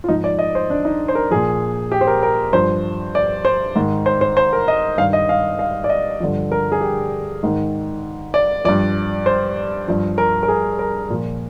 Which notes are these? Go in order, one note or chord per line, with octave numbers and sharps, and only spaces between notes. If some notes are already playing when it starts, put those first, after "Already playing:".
F4
G#2 F3 D#4
D5
D#5
C5
D4
D#4
C5
A#4
A#2 F3 G#4
G4
C5
A#4
A#4
G2 F3 C5
D5
C5
G#2 D#3
C5
C5
C5
A#4
D#5
G2 D#3 F5
D#5
F5
F5
D5
D#5
G2 D3 F3
A#4
G#4
G4
G#2 D#3
D5
G2 F3 D5
C5
G2 F3
A#4
A#4
G#4
A#4
A#2 F3